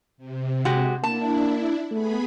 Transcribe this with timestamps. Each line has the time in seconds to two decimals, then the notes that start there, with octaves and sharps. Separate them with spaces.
0.17 C3
0.65 G#3 F#4 G4
1.04 A#3 D4 E4 A5
1.91 A3 B3 G#4 B5